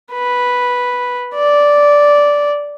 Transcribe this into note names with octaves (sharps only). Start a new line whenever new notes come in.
B4
D5